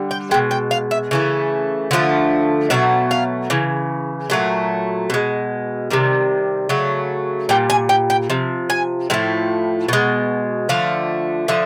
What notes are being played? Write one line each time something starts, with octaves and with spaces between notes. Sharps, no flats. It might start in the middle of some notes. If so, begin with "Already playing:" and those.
Already playing: D3 G3
G5
B2 G#3 G5
G5
F5
E5
C#3 E3 A3
D3 F3 A3
B2 F#3 A3 E5
F5
C#3 E3
A#2 F#3 A3
B2 G#3
C3 D#3 G3
C#3 F#3 A3
A#2 G3 G5
G#5
G5
G5
C3 F3
G#5
A2 F3 A3
B2 G#3
D3 F3 A3 F5
D3 F3 E5